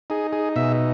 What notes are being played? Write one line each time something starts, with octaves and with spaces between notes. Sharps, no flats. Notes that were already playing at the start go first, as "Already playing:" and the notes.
D#4 G#4
G#4
B2 E5